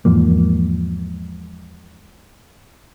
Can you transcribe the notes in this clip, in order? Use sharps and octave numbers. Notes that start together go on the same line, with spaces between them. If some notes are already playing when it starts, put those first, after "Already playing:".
E2 G#2 F3 A#3